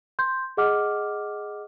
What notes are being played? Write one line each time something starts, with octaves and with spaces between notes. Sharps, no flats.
C6 G6
G#4 D#5 F#5 D6 F6